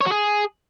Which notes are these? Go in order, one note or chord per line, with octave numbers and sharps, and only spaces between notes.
C#5
F#4
G#4